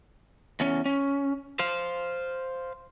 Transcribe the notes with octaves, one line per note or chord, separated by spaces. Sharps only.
E2 C#4
C#4
C5 F5